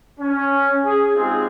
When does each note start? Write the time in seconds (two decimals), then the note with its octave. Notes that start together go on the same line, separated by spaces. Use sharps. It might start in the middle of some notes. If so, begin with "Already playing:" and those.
0.20 C#4
0.85 G#4
1.15 G#3 C4 D#4 F4 G4 G#4